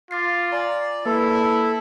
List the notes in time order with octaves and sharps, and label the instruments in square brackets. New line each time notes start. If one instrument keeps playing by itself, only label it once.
[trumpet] F4 [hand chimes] D6 A6 C7
[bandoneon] D5 [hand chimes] G#5 A#5
[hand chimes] A#3 B4 [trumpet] E4 [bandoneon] A4